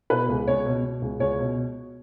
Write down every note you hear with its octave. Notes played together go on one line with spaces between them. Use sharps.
B2 B4
C#2
C#2 C#5
B2
B2
C#2
C#2 C#5
B2